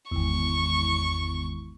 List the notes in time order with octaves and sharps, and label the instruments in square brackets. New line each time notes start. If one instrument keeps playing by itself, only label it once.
[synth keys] G#1 E2 [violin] C#6